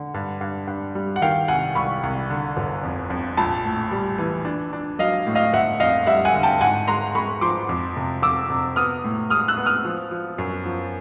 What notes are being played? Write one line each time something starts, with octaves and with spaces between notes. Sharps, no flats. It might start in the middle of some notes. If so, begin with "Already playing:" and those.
Already playing: D3
G2
G2
G2
G3
F#5
D#3 F5 G5
C2 F#5 G#5
C2 B5 C#6
C2
D3
G1
F2
F2
A#1 A5 B5
A2
G3
E3
D4
D4
F#3 D#5 F5
A2
D#5 F5
G1 E5 F#5
F2 D#5 F5
G3 E5 F#5
F#5 G#5
D3
G5 A5
G#2 F#5 G#5
G#3 A#5 C6
G#3 B5 C#6
F3 C6 D6
F2
C3
F2 D6 E6
C3
B3 D#6 F6
A2
G#3 D#6 F6
E6 F#6
B3
D#6 F6
F3
F3
F#2
F3